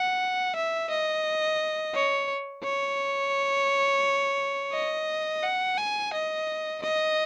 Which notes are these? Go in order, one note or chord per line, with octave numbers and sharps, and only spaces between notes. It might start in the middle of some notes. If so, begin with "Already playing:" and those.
Already playing: F#5
E5
D#5
C#5
C#5
D#5
F#5
G#5
D#5
D#5